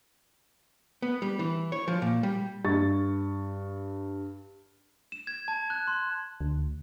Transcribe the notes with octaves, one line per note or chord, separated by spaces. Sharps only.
B3
G3
E3
C#5
F3
A#2
G3
G2 C#6 A6
E7
G#6
A5
F#6
C6
D2